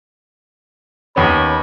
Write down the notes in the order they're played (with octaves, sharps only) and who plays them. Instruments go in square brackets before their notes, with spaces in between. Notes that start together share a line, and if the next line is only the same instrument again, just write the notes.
[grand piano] D#2 B3 C#4 [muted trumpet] B5